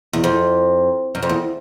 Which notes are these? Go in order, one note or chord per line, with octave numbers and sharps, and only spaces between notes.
E2
F2
F#2
F2
E2